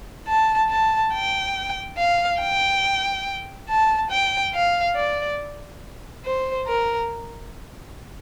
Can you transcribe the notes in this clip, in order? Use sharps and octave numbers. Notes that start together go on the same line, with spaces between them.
A5
A5
G5
F5
G5
A5
G5
F5
D5
C5
A#4